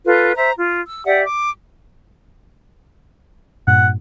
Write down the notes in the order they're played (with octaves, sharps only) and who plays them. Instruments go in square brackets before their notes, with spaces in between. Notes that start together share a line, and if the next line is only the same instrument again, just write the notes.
[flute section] F4 A4 B4
C5 E5 A#5
F4
E6
G4 D5 E5 F#5
D6
[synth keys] G2 A#2 [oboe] F#5